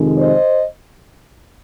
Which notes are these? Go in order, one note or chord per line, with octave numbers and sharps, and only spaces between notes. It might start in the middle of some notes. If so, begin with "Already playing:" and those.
Already playing: F2 C3 D#3 G#3
C5 D#5